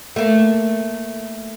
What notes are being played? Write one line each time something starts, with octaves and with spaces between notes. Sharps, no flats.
A3 A#3